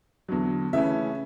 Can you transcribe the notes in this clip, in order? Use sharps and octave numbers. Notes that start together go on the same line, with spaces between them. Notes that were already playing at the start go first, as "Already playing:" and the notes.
E2 D3 F#3
C#3 E3 A3 C#4 E5